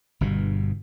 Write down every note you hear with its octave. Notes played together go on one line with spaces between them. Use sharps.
G1 G2 B2